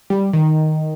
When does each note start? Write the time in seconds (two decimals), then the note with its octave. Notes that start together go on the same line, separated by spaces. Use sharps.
0.10 G3
0.33 D#3